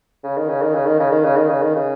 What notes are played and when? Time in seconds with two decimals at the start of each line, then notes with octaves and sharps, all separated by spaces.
0.23 C#3
0.37 D#3
0.49 C#3
0.62 D#3
0.74 C#3
0.86 D#3
0.99 C#3
1.11 D#3
1.24 C#3
1.36 D#3
1.49 C#3
1.62 D#3
1.75 C#3